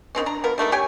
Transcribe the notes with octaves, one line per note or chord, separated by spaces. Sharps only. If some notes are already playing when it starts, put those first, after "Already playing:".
D#3 E3 C4 C#4
D4 A#5
F3 B3 A#4
G3 A3 A#3 D#4
G4 C#5 G5 G#5